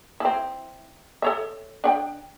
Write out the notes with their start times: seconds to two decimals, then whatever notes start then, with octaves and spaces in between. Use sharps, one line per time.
0.20 C4 E4
1.22 A4 C#5 E5
1.84 D4 F#5 G5